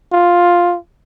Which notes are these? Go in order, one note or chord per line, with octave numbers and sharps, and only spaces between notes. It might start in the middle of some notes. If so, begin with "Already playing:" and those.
F4